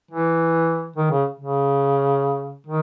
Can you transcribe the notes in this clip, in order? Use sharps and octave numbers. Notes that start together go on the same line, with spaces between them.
E3
D#3
C#3
C#3
D#3